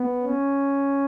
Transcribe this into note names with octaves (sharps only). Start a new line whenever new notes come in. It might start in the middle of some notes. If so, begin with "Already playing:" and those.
Already playing: B3
C#4